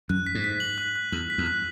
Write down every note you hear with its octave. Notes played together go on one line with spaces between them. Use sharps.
F#2 F#6
B6
G#2
B6
F#7
F#6
F#6
E2 F#7
B6
E2
F#6